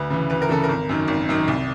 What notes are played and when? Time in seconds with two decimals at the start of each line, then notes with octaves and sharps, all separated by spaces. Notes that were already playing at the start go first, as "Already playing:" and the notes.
Already playing: D2 B4
0.10 C#3 E3
0.30 D2 B4
0.42 A#4
0.49 C#3 E3 A4
0.64 A#4
0.69 G#1
0.89 F#2 D#3
1.08 G#1
1.29 F#2 D#3
1.48 C2